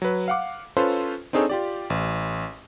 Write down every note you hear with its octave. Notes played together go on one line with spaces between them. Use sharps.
F#3 B4
F5 F#5 D6
C#4 F4 A4 B4 C5
C4 D4 D#4 G#4 A4 C#5
F4 G4 D5
A1